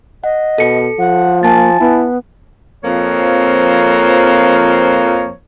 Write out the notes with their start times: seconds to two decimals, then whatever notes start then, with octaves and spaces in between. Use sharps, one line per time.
0.24 D#5 F#5
0.58 B2 A4 C#7
0.99 F3 F#5
1.43 A#3 G#5 A5 A6
1.80 B3 E4
2.84 F2 F3 A#3 C4 C#5